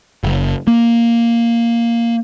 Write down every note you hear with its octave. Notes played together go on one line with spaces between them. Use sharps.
F#1
A#3